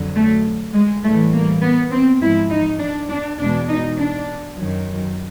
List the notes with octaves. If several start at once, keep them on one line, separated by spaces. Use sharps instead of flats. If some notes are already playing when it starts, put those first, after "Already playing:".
Already playing: F2 D3 F#3
A3
G#3
A2 E3 G3 A3
A#3
B3
C4
G#2 F3 G#3 E4
D#4
D4
D4
E2 B2 G#3 D4
D#4
D4
F#2 D#3 F#3